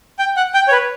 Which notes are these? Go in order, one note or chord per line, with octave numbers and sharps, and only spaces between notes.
G5
F#5
G5
C#5
B4